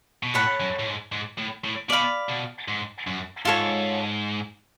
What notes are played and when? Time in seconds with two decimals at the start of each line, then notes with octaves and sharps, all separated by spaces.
0.23 B2
0.34 A2 A4 C#5 F#5 B5
0.60 F#2
0.79 A2
0.86 G#2
1.12 G#2
1.38 A2
1.64 A2
1.89 B2 D5 F5 B5
2.29 B2
2.68 G#2
3.07 F#2
3.45 G#2 F4 A4 C#5